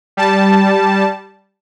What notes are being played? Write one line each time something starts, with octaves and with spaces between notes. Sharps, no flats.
G3 A5